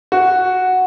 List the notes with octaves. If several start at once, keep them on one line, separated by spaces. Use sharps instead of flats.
F#4